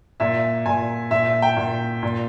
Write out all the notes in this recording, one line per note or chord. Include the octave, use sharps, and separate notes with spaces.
A#2 E5
A#2 G#5
A#2 E5
G5
A#2
A#2